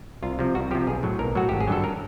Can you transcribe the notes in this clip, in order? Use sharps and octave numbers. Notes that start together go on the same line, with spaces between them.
C2 F4
C3 F3
C2 F#4
C3 F3 G4
B1 G#4
A2 F#3
B1 A#4
A2 F#3 F#4
G#1 G4
G#4
G2 D3 F#3 A4
A#4